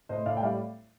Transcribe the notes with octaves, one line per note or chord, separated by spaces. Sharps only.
A2 C5 D#5
A2 D5 F5
G5
G3 D5 F5